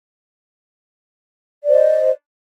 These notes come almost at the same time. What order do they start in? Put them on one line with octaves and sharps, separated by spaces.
D5 C5 D#5